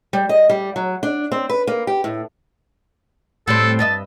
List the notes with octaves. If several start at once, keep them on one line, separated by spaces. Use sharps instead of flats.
G3
D#5
G3
F#3
D4
C4
B4
A#3
G4
A2
A2 G3 C4 A4
G2 D#5 E5 A5